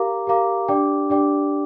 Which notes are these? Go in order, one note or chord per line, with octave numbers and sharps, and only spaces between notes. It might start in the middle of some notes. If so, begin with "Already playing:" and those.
Already playing: G4 A#4 F5 A#5 D6
G4 A#4 F5 A#5 D6
D4 G4 D5 G5 D6
D4 G4 D5 G5 D6